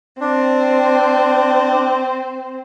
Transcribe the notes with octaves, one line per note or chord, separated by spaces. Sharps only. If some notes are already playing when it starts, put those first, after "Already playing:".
C4 D4